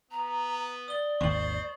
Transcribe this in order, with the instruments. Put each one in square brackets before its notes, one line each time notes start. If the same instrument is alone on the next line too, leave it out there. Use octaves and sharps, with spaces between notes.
[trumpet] B3 [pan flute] A#5
[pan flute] D5 [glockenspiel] D#6 G7
[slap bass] G#1 D#2 [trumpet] C5 [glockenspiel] C#6 D#6 F#7